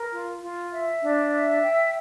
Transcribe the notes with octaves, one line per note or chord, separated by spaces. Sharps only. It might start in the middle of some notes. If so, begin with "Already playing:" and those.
Already playing: A#4
F4
F4
E5
D4
E5
G5